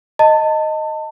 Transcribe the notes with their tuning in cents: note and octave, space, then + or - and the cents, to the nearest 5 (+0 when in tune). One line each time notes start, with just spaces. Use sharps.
D#5 +0 A5 +30